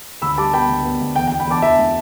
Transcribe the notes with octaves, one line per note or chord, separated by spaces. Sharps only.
D2 B5 E6
G3 A5 D6
B3 G5 B5
D2
B3
D2
E2 G5
G5
E2
G5 B5
E2 A5 D6
E2 E5 A5
A3